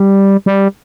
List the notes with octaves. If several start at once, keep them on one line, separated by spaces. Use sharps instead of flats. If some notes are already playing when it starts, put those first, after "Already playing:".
Already playing: G3
G3